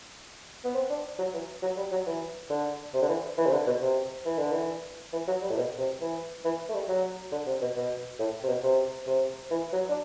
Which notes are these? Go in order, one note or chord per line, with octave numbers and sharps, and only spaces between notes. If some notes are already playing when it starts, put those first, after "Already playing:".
B3
C4
D4
F#3
E3
F#3
G3
F#3
E3
D3
C3
D3
E3
E3
C3
D3
B2
C3
E3
D3
E3
E3
F#3
G3
A2
B2
C3
E3
E3
A3
G3
F#3
D3
C3
B2
B2
A2
C3
B2
C3
C3
E3
F#3
D4